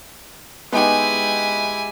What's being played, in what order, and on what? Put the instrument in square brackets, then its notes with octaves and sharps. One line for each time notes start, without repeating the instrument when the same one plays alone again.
[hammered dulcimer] G#3 G4 [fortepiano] B3 D#4 [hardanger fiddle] E4 G#5